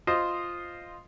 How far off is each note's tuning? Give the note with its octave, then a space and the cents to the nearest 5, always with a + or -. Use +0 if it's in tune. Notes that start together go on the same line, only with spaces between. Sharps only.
F4 +0 C5 +0 D#5 -5